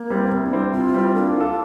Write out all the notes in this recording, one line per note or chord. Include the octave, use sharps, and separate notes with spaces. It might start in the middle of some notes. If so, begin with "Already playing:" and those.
Already playing: A#3
G3 C4 E4
C3 C4
D4
G3 C4 E4
C3 F4
G3 C4 E4
A#3 D4
F4 A4